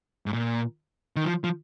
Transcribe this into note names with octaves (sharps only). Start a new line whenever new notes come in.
G#2
A#2
D#3
F3
F3